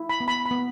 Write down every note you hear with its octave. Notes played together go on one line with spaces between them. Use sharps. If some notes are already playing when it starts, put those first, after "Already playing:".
Already playing: E4
B5
B3
B5
B5
B3